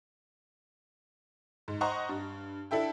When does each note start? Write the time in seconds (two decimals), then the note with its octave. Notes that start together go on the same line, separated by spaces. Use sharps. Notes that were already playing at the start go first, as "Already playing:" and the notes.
1.68 G#2
1.81 C5 D#5 F#5 A#5 C#6
2.09 G2
2.71 D4 E4 A4 E5 G5